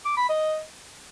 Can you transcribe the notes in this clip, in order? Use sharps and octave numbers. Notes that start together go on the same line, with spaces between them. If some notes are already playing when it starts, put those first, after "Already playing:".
D6
B5
D#5